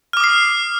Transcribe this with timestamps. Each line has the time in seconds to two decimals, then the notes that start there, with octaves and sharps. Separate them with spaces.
0.13 F6
0.17 D6
0.20 D#6
0.24 C7